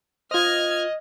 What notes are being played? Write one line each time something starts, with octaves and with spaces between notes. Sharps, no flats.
F4 C5 D#5 F6 G#6